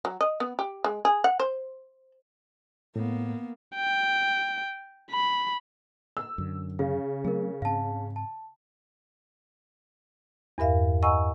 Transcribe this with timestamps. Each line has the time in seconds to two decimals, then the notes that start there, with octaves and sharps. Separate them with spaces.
0.05 F#3
0.21 D#5
0.40 B3
0.59 G4
0.84 G#3
1.05 G#4
1.24 F#5
1.39 C5
2.96 A2 A#3 B3
3.75 G5
5.11 B5
6.17 E6
6.38 F#2 D3
6.79 C#3 F5
7.25 F#3 A3 C4 G#4 A#4
7.62 G#2 C4 F5 A5
8.16 A5
10.58 E2 G2 A#4 E5 F5
11.03 D#5 F#5 G#5 A#5 C#6 E6